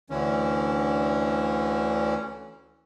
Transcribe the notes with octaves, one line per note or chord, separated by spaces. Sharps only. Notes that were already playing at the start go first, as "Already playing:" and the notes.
D2 D3 E3 C#4